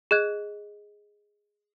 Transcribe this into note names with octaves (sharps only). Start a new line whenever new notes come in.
G#4 D#5 F#6 G#6